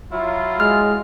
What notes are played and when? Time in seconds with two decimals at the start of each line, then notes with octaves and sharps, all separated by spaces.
0.12 F#3 E4 F4
0.60 G#3 F6